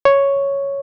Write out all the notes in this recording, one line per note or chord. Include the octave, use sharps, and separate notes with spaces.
C#5